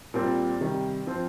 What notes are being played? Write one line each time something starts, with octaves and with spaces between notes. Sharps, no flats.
A#2 G3 C4 F4
C3 D#3 G3
F3 C4 F4 C5